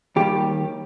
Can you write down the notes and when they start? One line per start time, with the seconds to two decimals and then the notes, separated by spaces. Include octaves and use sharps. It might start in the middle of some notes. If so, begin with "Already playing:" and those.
0.16 D#2 D#3 G3 G4